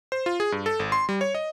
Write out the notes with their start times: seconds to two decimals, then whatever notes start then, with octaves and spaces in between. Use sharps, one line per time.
0.12 C5
0.26 F4
0.40 G#4
0.52 G2
0.66 A4
0.80 G#1
0.92 C6
1.09 G3
1.21 C#5
1.35 D#5